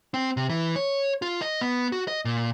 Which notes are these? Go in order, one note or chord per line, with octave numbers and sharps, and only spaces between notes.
C4
C3
E3
C#5
F4
D#5
B3
F#4
D#5
A#2